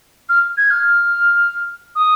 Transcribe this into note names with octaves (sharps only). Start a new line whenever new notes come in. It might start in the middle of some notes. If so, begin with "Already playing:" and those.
F6
G#6
F6
D#6